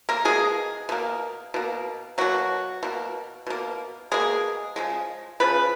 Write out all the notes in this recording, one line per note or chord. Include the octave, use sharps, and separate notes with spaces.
A#3 A#4
B2 G#3 A#3 G#4
B2 A#3
B2 A#3
B2 F#3 A#3 F#4
B2 A#3
B2 A#3
B2 G#3 A#3 G#4
C#3 F3 G#3
C#3 F3 B4